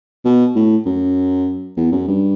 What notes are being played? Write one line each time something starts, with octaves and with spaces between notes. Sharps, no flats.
B2
A2
F#2
E2
F#2
G2